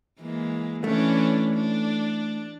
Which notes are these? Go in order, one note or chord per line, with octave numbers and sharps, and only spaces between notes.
E3 G#3 A#3
E3 A3 C#4 D4
D4